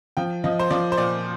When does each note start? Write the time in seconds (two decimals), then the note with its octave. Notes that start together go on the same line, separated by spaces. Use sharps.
0.17 F3 G5
0.44 F3 D#5
0.59 C5
0.70 F3 D5
0.92 C5
0.97 A#2 D5